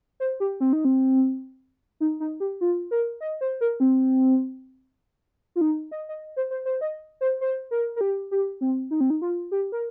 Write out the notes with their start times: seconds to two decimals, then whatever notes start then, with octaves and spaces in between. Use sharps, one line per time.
0.20 C5
0.40 G4
0.60 C4
0.73 D#4
0.85 C4
2.00 D#4
2.20 D#4
2.40 G4
2.61 F4
2.91 A#4
3.21 D#5
3.41 C5
3.61 A#4
3.80 C4
5.56 F4
5.61 D#4
5.91 D#5
6.09 D#5
6.36 C5
6.51 C5
6.65 C5
6.81 D#5
7.21 C5
7.41 C5
7.71 A#4
7.96 A#4
8.01 G4
8.31 G4
8.61 C4
8.91 D#4
9.01 C4
9.10 D#4
9.22 F4
9.51 G4
9.72 A#4